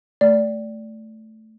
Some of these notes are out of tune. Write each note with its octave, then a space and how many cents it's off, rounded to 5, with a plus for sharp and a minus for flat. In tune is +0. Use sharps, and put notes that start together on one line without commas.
A3 +0 D5 -15